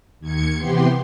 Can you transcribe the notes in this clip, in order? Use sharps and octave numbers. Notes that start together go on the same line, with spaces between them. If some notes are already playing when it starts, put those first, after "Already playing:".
D#2 G#6 C#7
C3 E3 B3 G4 C6